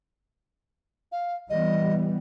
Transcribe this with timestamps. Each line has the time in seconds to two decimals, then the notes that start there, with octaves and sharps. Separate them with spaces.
1.12 F5
1.50 E3 G3 B3 D#5